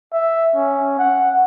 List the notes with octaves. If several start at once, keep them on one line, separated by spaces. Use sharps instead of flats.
E5
C#4
F#5